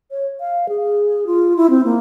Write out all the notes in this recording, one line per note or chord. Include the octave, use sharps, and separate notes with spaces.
C#5
F5
G#4
F4
E4
C4
A#3